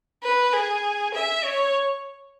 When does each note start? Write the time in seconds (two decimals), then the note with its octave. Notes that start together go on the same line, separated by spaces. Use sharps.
0.23 B4
0.53 G#4
1.14 E5
1.44 C#5